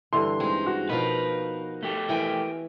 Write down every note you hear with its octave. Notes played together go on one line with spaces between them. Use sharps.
G2 D3 E3 C6
G#3 C4 D#4
F#4
B2 F3 D#4 A#4 B4 F5
A3 G4
E3 A#4 G5 G#5